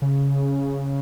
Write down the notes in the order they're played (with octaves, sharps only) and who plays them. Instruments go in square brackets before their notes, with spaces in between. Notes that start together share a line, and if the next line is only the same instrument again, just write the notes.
[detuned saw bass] C#3